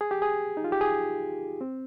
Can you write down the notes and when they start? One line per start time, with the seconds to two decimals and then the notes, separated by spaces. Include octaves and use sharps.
0.01 G#4
0.11 G4
0.22 G#4
0.57 D#4
0.64 F4
0.72 G4
0.81 G#4
1.61 C4